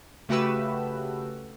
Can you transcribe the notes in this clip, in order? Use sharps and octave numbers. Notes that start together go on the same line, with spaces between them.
C#3 A3 F#4 G4 B4 E6